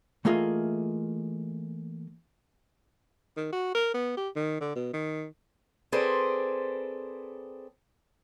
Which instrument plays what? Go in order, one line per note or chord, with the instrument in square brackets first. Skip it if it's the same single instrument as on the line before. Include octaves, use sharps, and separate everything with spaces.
[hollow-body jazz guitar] E3 A3 A#3 F4 G#4 D#5
[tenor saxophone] D#3
F#4
A#4
B3
G4
D#3
D3
B2
D#3
[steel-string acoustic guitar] C4 G#4 A4 B4 C5 D5